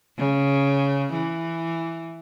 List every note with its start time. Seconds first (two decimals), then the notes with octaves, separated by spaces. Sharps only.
0.19 C#3
1.13 E3